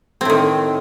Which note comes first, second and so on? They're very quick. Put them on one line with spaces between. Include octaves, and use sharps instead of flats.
C4 A2 D#3